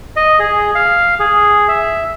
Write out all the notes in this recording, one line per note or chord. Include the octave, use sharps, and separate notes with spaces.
D#5
G#4
F5
G#4
E5